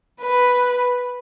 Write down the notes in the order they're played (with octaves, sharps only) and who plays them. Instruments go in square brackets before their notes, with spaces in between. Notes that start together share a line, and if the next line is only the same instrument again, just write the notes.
[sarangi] B4